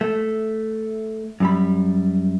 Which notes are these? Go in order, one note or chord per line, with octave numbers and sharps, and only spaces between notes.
A3
F#2 G3 B5